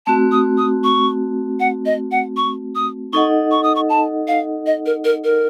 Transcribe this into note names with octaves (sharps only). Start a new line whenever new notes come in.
A3 C4 F#4 A5
D#6
D#6
C#6
F#5
D#5
F#5
C#6
D#6
D#4 A4 D#5 F#5 C#6
C#6
D#6
C#6
A5
F5
D#5
A#4
A#4
A#4